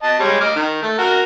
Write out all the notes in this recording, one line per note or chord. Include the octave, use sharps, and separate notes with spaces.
D#5 A5
G3 G#3 C#5
D#5 D6 F6
D#3
A3
F#4 A#4